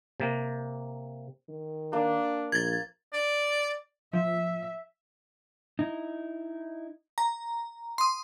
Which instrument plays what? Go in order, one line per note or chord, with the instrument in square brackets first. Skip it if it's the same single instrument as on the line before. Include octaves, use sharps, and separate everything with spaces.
[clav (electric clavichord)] C3 A#3
[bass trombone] D#3
[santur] A#3 [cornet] D4
[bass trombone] A#1 [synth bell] G#6 A6
[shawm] D5
[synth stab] F3 [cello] E5
[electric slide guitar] D#4 E4
[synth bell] A#5
C6 D#6